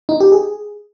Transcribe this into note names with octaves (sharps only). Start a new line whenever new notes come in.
D#4
G4
G#4